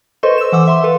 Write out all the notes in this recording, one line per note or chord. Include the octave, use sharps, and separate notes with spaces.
A4 B4 C5 D#5 C6 C#6
E6 E7
E3 F#5 D6 E6
E5 C6
A4 B4 F5